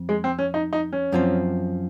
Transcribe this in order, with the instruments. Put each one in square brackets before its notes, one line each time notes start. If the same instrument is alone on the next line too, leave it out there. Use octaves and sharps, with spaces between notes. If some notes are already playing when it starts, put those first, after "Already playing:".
Already playing: [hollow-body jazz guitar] F2
[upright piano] G#3
C4
C#4
D#4
D#4
C#4
[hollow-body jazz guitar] F#2 F3 C4